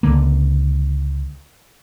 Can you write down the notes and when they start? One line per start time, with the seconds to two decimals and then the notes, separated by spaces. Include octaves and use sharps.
0.03 C#2 D3 A#3